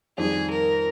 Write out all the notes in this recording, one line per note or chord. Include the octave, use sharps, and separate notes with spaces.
F2 D#3 G3 G#4
A#4